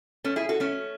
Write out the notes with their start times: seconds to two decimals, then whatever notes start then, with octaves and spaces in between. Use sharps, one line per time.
0.24 A3 C#4
0.36 E4 G#4
0.49 F#4 A4
0.60 A3 C#4